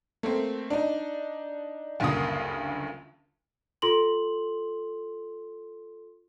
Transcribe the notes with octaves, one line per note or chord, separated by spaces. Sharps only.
A3 A#3 C4
D4 D#4
F#1 D2 G2 A#3 F4 D#6
F4 A4 C6 F#7